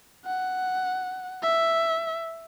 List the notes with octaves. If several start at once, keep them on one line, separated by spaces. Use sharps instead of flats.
F#5
E5